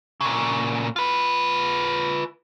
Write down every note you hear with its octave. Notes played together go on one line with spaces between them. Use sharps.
A#2 C#3
F4 B4